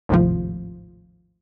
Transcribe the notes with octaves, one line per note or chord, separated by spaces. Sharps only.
G#1 D#2 A2 C3 F3